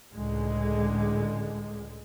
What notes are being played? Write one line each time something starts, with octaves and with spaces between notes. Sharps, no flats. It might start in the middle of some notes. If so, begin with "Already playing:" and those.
C#2 A2 D3 G#3